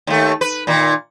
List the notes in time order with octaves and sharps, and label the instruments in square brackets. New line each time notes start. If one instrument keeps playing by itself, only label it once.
[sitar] D#2 A3
B4
A#2 D#3